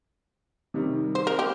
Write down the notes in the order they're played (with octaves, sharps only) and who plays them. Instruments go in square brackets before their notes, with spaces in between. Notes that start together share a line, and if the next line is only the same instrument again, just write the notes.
[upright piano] C3 D#3 G3 D#4
[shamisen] C5
A#4
G4